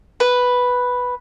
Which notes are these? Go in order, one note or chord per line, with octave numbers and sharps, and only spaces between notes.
B4